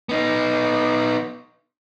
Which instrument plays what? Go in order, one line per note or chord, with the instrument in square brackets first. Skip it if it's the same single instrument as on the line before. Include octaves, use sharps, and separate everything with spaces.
[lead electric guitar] B3 D#4